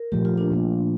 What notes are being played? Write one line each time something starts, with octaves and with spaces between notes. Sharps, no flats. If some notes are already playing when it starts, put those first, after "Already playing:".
Already playing: A#4
A#2 F3 A3 G4
F4
D4
A#2 F3 A#3 F4